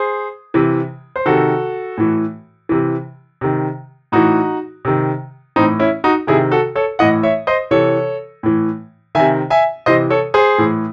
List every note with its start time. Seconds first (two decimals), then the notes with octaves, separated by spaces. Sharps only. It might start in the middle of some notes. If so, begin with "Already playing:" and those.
Already playing: G#4 C5
0.54 C3 E3
1.16 C5
1.26 C3 D#3 F#4 A4
1.98 A2 E3
2.69 C3 E3
3.41 C3 D#3
4.12 A2 E3 D#4 F#4
4.85 C3 D#3
5.56 A2 E3 C4 D#4
5.79 C#4 E4
6.04 D#4 F#4
6.27 C3 D#3 E4 G#4
6.51 F#4 A4
6.75 A4 C#5
6.99 A2 E3 D#5 F#5
7.23 C#5 E5
7.47 C5 D#5
7.71 C3 E3 A4 C#5
8.43 A2 E3
9.15 C3 D#3 E5 G#5
9.50 E5 G#5
9.86 C3 E3 C5 D#5
10.10 A4 C#5
10.34 G#4 C5
10.58 A2 E3